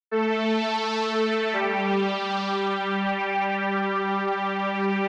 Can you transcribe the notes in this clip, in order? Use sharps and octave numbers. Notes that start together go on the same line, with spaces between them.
A3 A4
G3 G4